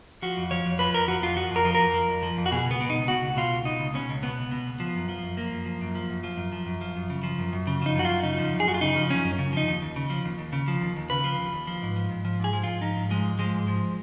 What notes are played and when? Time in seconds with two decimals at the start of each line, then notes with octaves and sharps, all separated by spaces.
0.22 F3 F#4
0.37 F2
0.51 F3 C#5
0.66 F2
0.79 F3 B4
0.94 F2 A#4
1.08 F3 F#4
1.22 F2 F4
1.36 F3 F#4
1.51 F2 A#4
1.65 F3
1.75 A#4
1.80 F2
1.94 F3
2.09 F2
2.23 F3
2.38 F2
2.46 F#4
2.52 B2 G#4
2.66 C#2 B3
2.81 B2
2.90 C#2 D#4
3.08 B2 F#4
3.22 C#2
3.37 B2 F4
3.52 C#2
3.65 B2 D#4
3.80 C#2
3.94 B2 C#4
4.09 C#2
4.23 B2 B3
4.38 C#2
4.51 B2
4.66 C#2
4.80 F3
4.95 F#2
5.09 F3
5.23 F#2
5.37 F3 A#3
5.52 F#2
5.66 F3
5.81 F#2
5.95 F3
6.10 F#2
6.24 F3
6.37 F#2
6.52 F3
6.66 F#2
6.81 F3
6.96 F#2
7.10 C#3
7.23 F3
7.39 F#2
7.53 F#2
7.67 C#3
7.82 F3 D#4
7.96 F#2 F#4
8.05 F4
8.10 F#2
8.23 C#3 D#4
8.38 F3
8.53 F#2
8.60 G#4
8.67 F#2 F#4
8.74 F4
8.81 C#3 D#4
8.96 F3
9.10 F#2 C#4
9.24 F#2
9.39 C#3
9.53 F3 D#4
9.68 D#2
9.82 D#2
9.96 C#3
10.10 F3
10.25 D#2
10.38 D#2
10.53 C#3
10.68 F3
10.81 D#2
10.97 D#2
11.10 C#3 B4
11.24 F3
11.40 D#2
11.53 D#2
11.67 F3
11.83 G#2
11.96 F3
12.10 G#2
12.25 F3
12.40 G#2 G#4
12.53 F3
12.63 G#2 F4
12.82 F3 D#4
12.97 G#2
13.10 F3 G#3
13.25 G#2
13.39 F3 G#3
13.54 G#2
13.68 F3